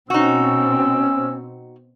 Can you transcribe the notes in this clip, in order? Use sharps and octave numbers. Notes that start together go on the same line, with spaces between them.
B2 C4 C#4 D#4 F#4 E6